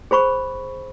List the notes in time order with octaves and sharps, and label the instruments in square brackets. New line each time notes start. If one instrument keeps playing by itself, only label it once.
[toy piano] G#4 C5 B5 C#6